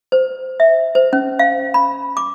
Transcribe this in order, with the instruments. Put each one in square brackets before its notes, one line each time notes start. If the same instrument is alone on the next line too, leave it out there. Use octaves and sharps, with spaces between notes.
[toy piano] C5
E5
C5
C#4
F5
B5
D6